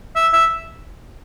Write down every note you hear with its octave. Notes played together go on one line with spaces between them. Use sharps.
E5
E5